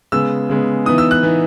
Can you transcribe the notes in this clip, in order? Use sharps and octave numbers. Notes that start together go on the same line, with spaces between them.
C#3 G#3 B3 E6
C#3 G#3 B3
E3 B3 D#4 D#6
E6
F#6
E3 B3 D#4